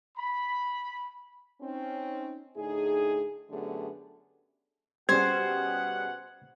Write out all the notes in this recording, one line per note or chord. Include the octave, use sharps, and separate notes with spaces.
B5
C4 C#4 D#4
A2 D3 D#4 G#4
F#2 D3 A3 B3 G4 G#4
B2 G3 C#4 G#4 C5 F#5 G#6